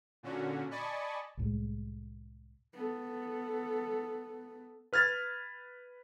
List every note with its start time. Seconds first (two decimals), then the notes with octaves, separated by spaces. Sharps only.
0.23 A#2 D3 C#4 F#4
0.71 D5 D#5 G#5 A5 B5 C#6
1.37 C2 A2 G#3
2.73 B3 A4
4.93 B4 F6 G#6 A6